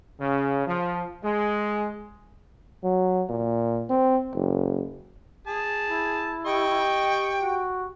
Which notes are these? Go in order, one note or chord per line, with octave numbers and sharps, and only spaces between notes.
C#3
F3
G#3
F#3
A#2
C4
F#1
G#4 A5
E4
G4 D#5 G5 C#6
F#4